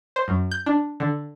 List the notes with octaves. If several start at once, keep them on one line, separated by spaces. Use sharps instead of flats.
C5
F#2
G6
D4
D3